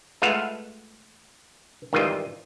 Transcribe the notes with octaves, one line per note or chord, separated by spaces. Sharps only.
G#3 A3 F4 B4 F5 F#5
G#1 D#3 E3 G3 F4 D#5